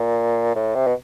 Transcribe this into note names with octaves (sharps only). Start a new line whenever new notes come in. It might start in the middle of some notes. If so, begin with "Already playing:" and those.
Already playing: A#2
A2
C3
B2